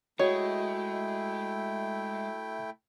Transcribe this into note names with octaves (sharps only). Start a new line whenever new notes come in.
G#3 A3 E4 F#4 C#5 D#5 G5